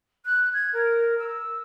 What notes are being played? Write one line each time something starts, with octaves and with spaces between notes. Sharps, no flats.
F#6
G#6
A#4
E6